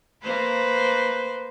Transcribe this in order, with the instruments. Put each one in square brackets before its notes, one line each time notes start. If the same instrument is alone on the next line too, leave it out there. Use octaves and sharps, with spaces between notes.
[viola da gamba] A#3 B4 C5